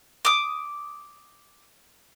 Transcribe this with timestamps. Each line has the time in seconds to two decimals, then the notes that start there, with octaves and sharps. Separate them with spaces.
0.25 D6 D#6